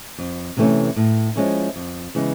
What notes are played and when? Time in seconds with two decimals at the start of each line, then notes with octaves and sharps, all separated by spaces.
0.18 F2
0.57 C3 E3 A3 C#4
0.96 A2
1.36 F3 G#3 C#4 E4
1.76 F2
2.15 C#3 E3 G#3 B3